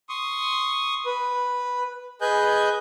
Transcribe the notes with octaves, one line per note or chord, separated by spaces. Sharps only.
C6 C#6 D#6
B4
G#4 B4 D#5 G#5 F#6 G6